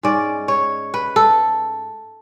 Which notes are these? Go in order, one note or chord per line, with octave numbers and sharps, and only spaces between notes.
G#2 G#3 C#4 D5
C#5
B4
A4